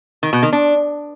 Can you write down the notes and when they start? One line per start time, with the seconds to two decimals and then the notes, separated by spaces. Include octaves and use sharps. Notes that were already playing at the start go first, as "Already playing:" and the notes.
0.23 D#3
0.33 B2
0.43 D#3
0.53 D4